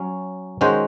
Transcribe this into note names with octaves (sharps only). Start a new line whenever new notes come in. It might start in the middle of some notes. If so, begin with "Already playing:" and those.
Already playing: F#3 C#4
D#3 G#3 C#4 F#4 C5